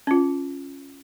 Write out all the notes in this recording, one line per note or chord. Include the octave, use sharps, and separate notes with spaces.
C#4 F4